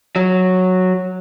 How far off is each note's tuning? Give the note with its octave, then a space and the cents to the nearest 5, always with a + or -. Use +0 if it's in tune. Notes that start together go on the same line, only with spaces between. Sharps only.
F#3 -5